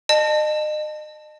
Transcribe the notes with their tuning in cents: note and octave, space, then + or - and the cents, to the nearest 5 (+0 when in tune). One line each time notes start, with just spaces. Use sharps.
D#5 -35 A5 +0